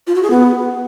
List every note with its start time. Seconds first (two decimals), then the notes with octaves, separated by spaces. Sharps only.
0.07 F4
0.15 F#4
0.23 G#4
0.31 B3